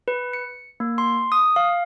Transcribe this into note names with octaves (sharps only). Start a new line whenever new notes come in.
B4
C#7
A#3
C6
D#6
F5